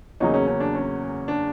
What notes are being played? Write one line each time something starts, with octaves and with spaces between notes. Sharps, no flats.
E2 C#3 F#3 A#3 C#4 D#4
C#4
C#4
D4
C#4
D4